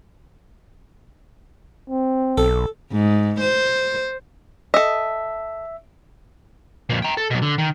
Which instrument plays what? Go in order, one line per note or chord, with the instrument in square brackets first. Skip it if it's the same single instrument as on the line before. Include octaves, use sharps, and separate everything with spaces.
[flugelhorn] C4
[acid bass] B1 [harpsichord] A4
[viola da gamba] G#2
C5
[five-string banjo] A4 D#5 [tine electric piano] E5
[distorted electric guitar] F2 A#2
G5 A#5
A4
B2 F#3
D3
D#3